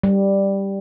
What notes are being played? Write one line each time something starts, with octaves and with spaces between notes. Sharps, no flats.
G3